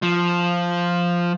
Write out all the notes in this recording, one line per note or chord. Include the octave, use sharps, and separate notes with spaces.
F3